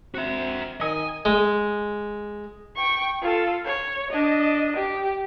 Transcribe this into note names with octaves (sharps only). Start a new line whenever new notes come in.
C4 F#4 E5
D#3 D#5 G#5
G#3
G5 C#6
F4 A4
C#5
D4 D#5
G4